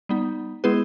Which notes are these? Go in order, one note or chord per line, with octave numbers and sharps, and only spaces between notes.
G3 B3 D#4
G#3 B3 E4 G#4 B4